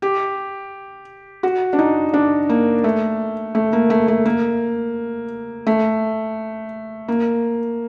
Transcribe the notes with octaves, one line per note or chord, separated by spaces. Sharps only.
G4
F#4
D4
D#4
D4
A#3
A3
A3
A#3
A3
A3
A#3
A3
A#3